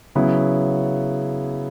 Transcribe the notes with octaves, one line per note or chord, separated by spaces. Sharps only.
C#3 F#3 B3 E4